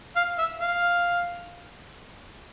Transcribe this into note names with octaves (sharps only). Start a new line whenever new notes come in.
F5
E5
F5